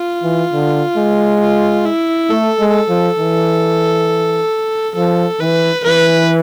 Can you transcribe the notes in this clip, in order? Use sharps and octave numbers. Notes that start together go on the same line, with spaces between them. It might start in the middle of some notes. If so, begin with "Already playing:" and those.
Already playing: F4
E3
D3
G#3
F4
E4
A3 A4
G#3
A4
F3
E3
F3 A4
E3 B4
E3 B4